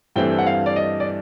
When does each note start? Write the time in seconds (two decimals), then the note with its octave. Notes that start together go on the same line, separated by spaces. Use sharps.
0.16 G2 E3 A3 C4 E4 G5
0.39 F#5
0.46 F5
0.66 D5
0.76 D#5
1.00 D5